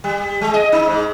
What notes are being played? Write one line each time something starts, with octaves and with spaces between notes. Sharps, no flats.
G3
G#3
D#5
D#4
G#2